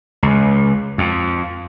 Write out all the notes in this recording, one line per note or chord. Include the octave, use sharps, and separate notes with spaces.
C#2
F2